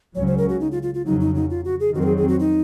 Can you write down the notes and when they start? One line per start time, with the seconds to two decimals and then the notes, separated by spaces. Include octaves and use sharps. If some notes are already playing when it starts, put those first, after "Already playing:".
0.15 C#2 C#3 F#3 C#4 C#5
0.27 C5
0.38 A#4
0.49 F#4
0.60 D#4
0.72 F4
0.83 F4
0.94 F4
1.06 F2 C#3 F#3 D#4
1.20 D#4
1.35 D#4
1.50 F4
1.65 F#4
1.80 G#4
1.95 F2 D#3 F#3 C4 F#4
2.01 A#4
2.05 G#4
2.17 G#4
2.28 F#4
2.40 D#4